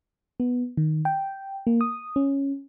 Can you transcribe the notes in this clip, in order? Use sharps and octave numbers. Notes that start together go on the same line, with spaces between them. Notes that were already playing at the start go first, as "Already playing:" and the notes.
B3
D#3
G5
A#3
D#6
C#4